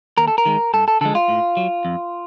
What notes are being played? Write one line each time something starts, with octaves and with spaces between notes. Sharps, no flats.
D#2 A#4
A4
A#4
D#3 G#3
G2 A4
A4
D3 F3 G#3 A4
F4
A2
F#3
F2